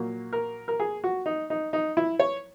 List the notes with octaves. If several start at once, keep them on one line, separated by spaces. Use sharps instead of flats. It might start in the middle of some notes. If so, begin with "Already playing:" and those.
Already playing: A#2 F#3 A#3
A#4
A#4
G#4
F#4
D#4
D#4
D#4
E4
C#5